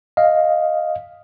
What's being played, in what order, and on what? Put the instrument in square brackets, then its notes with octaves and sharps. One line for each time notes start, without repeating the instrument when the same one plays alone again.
[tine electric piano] D#5 F5